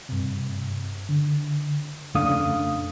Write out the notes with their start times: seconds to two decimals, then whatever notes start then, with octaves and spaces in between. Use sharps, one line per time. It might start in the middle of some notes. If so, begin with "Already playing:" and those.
0.09 G2 C3
1.09 D3
2.15 F2 C#3 A3 D4 F5 D#6